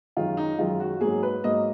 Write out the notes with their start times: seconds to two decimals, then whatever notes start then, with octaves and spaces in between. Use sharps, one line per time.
0.17 F#2 D#3 G#3 F4
0.37 D#4
0.58 F#2 D#3 G#3 F4
0.80 F#4
1.00 G#2 F#3 A#3 G#4
1.23 B4
1.44 G#2 F#3 A#3 D#5